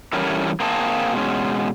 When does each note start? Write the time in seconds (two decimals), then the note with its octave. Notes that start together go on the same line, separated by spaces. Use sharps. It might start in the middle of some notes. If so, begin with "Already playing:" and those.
0.13 E3 G3 C#4 E4 A4 A#4
0.60 A#3 C4 G#4 A5
1.14 B2 G#3 C#4